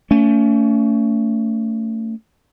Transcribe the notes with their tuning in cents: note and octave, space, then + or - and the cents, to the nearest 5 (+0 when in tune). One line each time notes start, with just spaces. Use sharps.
A3 +30 C#4 +35